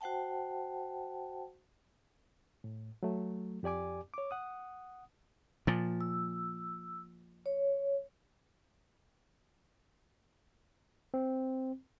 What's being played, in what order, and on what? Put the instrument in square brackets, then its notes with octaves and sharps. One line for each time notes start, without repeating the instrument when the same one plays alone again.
[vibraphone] F#4 C5 F#5 G5 A5
[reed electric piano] A2
F#3 A3
F2 G4 D5 G#5 D6
C#5 D6
F#5 D#6
[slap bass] A#2 F3
[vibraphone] E6
C#5
[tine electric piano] C4